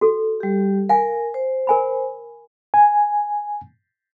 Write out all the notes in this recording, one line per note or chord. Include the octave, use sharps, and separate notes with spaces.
F#4 A4
G3 G4
A#4 F5 G#5
C5
A#4 G#5 B5
G#5